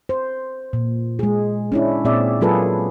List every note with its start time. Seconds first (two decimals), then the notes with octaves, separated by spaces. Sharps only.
0.09 C5
0.73 A#2
1.19 G#3 G#4
1.72 C#4 D4 E4
2.05 A#2 C4 G#4 D5 E5
2.41 F#3 A#3 F4 G#4 A4 B4